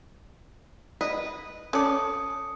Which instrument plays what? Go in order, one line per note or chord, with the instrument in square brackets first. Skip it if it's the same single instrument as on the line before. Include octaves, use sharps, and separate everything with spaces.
[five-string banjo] B4 D#5 [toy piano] D5
[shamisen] C#4 D5 [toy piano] A4 C#5 A5 [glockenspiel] D#6 C#7